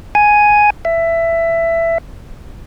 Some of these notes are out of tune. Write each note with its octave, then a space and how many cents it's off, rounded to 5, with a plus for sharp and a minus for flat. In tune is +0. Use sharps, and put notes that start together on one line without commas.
G#5 +5
E5 +15